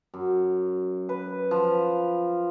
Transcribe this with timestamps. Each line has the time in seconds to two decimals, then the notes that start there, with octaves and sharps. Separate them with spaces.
0.14 F#2
1.09 B4
1.51 F3